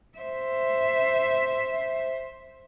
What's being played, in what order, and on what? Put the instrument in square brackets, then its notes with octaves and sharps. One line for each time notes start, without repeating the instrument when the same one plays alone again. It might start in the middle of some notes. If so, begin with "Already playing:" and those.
[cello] C5 E5